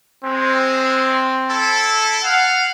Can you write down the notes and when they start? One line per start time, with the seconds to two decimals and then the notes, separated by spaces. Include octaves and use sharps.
0.24 G#3 C4
1.49 E4 A4
2.24 F5 F#5